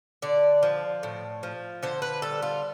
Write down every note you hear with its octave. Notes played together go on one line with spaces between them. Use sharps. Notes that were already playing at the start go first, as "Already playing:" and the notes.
D3 D5
F3
A2
F3
D3 C5
B4
G3 A4
F4